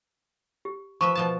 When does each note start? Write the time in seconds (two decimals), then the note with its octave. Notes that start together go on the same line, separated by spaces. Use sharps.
0.65 G4
1.01 F3 B4 E5 C#6
1.15 B2 F3 A5